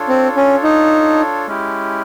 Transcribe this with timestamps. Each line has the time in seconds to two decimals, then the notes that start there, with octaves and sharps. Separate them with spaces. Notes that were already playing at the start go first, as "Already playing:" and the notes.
Already playing: D4 F4 A4 C#5
0.09 C4
0.37 C#4
0.63 D#4
1.47 G#3 C#4 E4 G4